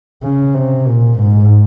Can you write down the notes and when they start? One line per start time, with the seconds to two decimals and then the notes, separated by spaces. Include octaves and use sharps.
0.23 C#3
0.55 C3
0.87 A#2
1.19 G#2